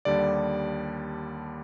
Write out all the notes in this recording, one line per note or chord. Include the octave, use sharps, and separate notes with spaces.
D#2 D3 G3 D5